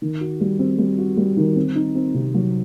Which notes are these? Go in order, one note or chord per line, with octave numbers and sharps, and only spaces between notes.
D#3
F#4
G3
C4
G3
F#4
G3
D#3
C4
D#4
C4
C3
F#3